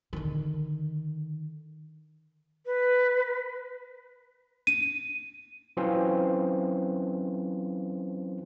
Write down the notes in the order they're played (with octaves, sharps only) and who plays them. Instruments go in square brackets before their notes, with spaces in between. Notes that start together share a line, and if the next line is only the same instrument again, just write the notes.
[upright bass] D3 D#3
[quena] B4
[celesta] D#7
[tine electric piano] E3 F#3 C4 C#4 F4 C5